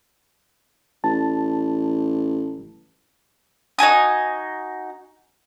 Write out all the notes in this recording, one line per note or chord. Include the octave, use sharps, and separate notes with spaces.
A1 A5
D#4 F#4 G#5 D#6